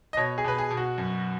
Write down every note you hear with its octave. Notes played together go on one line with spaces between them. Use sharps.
D#5
B2 C#5
G#4
B2 B4
G#4
B2
F#4
F#2